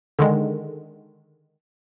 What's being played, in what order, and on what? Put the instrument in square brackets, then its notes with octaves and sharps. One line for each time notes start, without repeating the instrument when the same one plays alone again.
[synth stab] D3 D#3 G#3